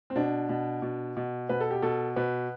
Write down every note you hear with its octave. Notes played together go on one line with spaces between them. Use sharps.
C4
B2 D4
B2
B2
B2
B2 B4
A4
G4
B2 A4
B2 B4